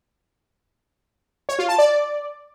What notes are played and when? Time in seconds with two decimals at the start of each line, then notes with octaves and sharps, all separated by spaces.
1.49 C#5
1.59 F4
1.69 A5
1.78 D5